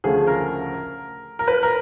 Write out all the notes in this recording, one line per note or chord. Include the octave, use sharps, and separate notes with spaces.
D2 C#3 F3 A3 G#4
A#4
A#4
B4
A#4